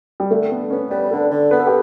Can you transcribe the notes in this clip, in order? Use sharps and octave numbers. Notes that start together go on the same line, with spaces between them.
G3
D3 A3
D3 B3
B3 C#4
G3 B4
D3 A4
D3
B3 B4
A4
G4